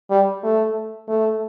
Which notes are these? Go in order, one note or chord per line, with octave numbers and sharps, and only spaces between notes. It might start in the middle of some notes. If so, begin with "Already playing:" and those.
G3
A3
A3